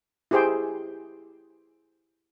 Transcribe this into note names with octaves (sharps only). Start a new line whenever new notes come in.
E4 G4 G#4 C5 G5